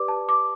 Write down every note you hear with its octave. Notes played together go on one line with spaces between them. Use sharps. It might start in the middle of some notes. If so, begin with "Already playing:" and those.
Already playing: G4 B4 D5 D6
A5
D6